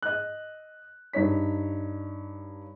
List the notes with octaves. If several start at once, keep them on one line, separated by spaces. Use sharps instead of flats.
D#5 F#6
G2 D#4 C#5 B6